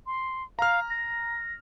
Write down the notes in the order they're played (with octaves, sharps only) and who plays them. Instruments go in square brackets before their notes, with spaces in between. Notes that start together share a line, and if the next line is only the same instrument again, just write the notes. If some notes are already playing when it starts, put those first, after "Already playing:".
[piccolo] C6
[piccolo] F5 [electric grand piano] A#5 F6
[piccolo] A#6